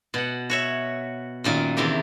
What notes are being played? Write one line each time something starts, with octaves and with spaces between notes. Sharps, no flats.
B2 F#5
F#4 C#5 E5
F#2 A#2 D#3
E2 C3 D#3 E4 G4